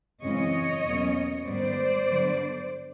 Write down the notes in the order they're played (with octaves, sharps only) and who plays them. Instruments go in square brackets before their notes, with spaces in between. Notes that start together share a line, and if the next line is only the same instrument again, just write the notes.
[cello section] F#2 C#3 E3 G#3 C4 C#5 D#5
E2 B2 F#3 A#3 C#4
G#2 D#3 G3 B3 C5 D5
G2 D3 F#3 B3